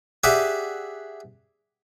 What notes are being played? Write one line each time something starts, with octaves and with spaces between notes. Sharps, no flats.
G4 G#4 D5 E5 F#5